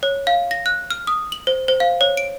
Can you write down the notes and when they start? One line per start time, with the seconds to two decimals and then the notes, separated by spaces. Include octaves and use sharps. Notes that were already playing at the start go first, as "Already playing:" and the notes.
0.03 C#5
0.27 F5
0.51 A#6
0.66 F#6
0.90 F6
1.07 D#6
1.32 F#7
1.47 C5
1.68 C5
1.80 F5
2.01 C#5
2.17 D7